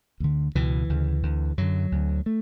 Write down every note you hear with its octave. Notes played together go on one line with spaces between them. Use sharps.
D2 D3
C#2 B2 E3
D2 C#3
D2 D3
F#2 D3 F#3
D2 D3
A3